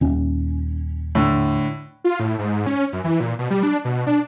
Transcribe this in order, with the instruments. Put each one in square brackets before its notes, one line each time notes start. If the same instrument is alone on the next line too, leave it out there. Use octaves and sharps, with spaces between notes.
[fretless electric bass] D#1 C#4
[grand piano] A2 D3
[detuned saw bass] F4
A2
G#2
C#4
F#2
E3
A#2
B2
G3
D4
B2
D4